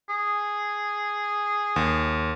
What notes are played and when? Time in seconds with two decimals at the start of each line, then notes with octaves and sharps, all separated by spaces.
0.09 G#4
1.76 D#2